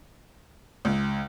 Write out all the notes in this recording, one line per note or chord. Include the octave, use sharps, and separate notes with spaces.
C#2